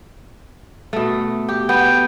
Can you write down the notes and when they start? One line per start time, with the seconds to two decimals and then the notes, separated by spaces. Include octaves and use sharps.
0.93 B2 A3
1.48 G4
1.69 B3 G5